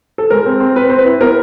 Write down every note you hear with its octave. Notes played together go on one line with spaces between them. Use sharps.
A4
G#3 A#4
C4
C4
C4 B4
C4 C5
B4
E4
B3 A#4